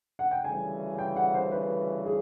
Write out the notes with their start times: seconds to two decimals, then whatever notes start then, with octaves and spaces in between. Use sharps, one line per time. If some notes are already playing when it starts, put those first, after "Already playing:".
0.19 F#5
0.31 G5
0.44 D2 C#3 E3 G3 G#5
0.98 G5
1.16 F#5
1.34 C5
1.52 B4
2.06 G#4